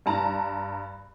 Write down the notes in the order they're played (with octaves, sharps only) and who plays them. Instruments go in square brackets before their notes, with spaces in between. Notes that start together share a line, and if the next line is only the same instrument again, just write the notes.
[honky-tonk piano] G2 A5 A#5